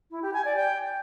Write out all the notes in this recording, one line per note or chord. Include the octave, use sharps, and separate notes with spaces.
E4
G4
G#5
D5
G5